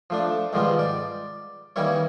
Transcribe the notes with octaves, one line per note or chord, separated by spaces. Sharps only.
F3 A3 D4
G#2 D#3 F3 G3 B3 F4
D5
D#3 E3 G3 A#3 E4 C#5